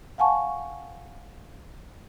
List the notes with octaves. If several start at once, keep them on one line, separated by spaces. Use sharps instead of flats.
F5 F#5 G#5 A5 C#6